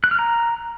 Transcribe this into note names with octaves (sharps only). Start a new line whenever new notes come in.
F#6
F6
A#5